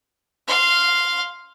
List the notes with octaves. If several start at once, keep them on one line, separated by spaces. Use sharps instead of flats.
F5 C6